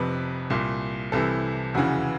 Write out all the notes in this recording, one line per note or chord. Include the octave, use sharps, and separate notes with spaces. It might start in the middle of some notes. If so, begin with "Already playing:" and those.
Already playing: F1 F2 C3 B4
C2 A#2
C2 C3 E3 A4
F1 E2 C#3 E3 F#4